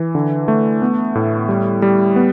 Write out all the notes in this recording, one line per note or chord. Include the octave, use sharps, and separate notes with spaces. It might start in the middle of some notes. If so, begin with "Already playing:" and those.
Already playing: E3
D3
A3
B3
A2
G3
G3
B3